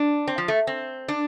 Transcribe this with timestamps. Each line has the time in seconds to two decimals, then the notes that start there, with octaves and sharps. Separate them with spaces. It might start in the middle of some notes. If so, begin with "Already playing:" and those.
Already playing: D4
0.28 C4
0.38 F3
0.48 A3
0.67 C4
1.08 D4